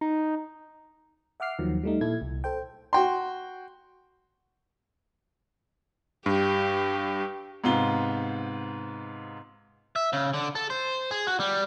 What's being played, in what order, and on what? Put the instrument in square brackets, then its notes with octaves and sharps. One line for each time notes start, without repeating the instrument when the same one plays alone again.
[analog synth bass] D#4
[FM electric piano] E5 F#5 D6 F6 C7
D#2 D#3 F3 F#3
G3 A3 D#4
A#2 E4 A4 G#6
C2
A4 C5 G5
[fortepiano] F#4 G5 C6
[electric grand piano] G2 [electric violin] G4
[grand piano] G#2 C3 B3 F4 G7
[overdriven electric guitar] E5
C#3
D3
A4
C5
G#4
F#4
G3